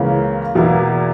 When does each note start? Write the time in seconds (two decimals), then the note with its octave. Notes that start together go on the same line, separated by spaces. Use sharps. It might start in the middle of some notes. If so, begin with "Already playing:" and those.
Already playing: C#2 C#3 E3 A#3 C#4
0.55 E2 B2 A#3 E4